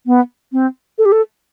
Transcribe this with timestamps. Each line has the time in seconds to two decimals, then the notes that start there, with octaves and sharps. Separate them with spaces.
0.06 B3
0.52 C4
0.98 A4
1.05 G4
1.12 A4